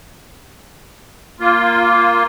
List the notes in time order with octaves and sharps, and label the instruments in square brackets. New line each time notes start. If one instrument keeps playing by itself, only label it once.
[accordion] A#3 F4